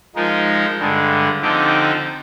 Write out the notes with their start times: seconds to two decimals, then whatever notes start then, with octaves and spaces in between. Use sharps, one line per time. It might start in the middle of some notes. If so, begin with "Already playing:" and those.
0.16 F3 G#3 D#4 A#4
0.78 G2 D3 G#3
1.41 D3 F3 C4 D#4 G4